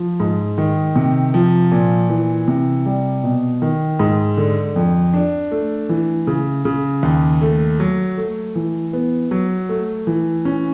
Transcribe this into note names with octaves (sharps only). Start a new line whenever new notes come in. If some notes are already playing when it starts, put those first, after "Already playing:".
Already playing: F3
G#2
D#3
C3
F3
A#2
E3
C3
G3
B2
D#3
G#2
D3
F2
D4
A3
E3
C#3
C#3
D#2
A3
F#3
A3
E3
B3
F#3
A3
E3
C#4